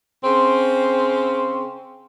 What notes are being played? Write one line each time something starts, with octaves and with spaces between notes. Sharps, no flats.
C#3 C4